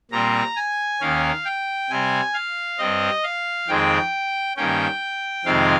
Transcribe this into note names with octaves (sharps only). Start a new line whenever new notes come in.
A#2 G3 C4 A#5
G#5
D#2 D#3 A#3 C#4 F5
G5
C3 G3 C4 G#5
F5
G2 G3 C4 D#5
F5
F2 D#3 G#3 C4 G5
G2 D#3 A#3 C#4 G5
F2 C3 D#3 G#3 C4 F5